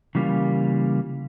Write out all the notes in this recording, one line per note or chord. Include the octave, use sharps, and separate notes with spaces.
C#3 E3 G3 A#3 F4